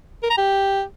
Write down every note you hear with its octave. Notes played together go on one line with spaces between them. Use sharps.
A#4
A#5
G4